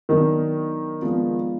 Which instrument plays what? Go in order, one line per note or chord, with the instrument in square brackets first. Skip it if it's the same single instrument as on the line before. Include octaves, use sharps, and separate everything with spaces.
[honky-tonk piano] D#3 [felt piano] F#3 B3 D4 F#4 A#4
[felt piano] F3 G#3 B3 D4 F4